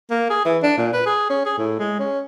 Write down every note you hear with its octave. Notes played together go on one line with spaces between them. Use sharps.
A#3
G#4
E3
D4
A#2
B4
G#4
C#4
G#4
A2
G#3
C#4